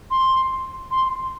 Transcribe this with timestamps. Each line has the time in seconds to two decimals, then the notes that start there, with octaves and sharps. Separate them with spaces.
0.11 C6
0.91 C6